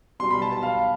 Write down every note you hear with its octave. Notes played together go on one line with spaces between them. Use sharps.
B2 G3 C6
B5
A5
A5
F5